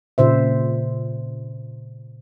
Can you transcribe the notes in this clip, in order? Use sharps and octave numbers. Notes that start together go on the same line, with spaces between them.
A#2 C#3 C5 E5